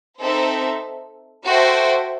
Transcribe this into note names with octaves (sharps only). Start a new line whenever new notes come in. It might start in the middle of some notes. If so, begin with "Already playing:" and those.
C4 D#4 A4 C5 E5
F#4 A4 C5 E5 G5